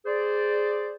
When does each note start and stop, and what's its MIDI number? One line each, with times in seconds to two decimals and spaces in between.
0.06 0.94 68
0.06 0.94 72
0.06 0.94 74